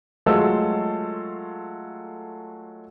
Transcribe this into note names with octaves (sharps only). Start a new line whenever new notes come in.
F#3 G#3 A3 F4 A4